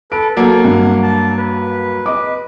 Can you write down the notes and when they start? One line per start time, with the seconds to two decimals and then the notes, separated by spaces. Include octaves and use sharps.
0.12 A4 B4 D7
0.37 F#3 A#3 A4
0.64 G2 F#5
1.02 A5
1.38 B4
2.06 D#5 D6